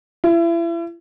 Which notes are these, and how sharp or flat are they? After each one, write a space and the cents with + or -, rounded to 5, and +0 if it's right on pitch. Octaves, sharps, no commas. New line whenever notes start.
E4 +35